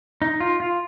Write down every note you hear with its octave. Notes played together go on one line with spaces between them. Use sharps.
D#4
F4
F4